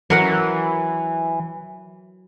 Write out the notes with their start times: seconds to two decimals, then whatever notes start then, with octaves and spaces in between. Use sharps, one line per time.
0.10 E3 F#3 A#4 F#5